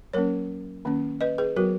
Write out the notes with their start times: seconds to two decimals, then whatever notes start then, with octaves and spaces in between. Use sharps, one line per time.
0.13 F#3 A#3 C#4 A#4 C#5
0.85 D#3 A#3 C#4
1.21 B4 D#5
1.38 G#4 B4
1.56 F#3 B3 F#4 A#4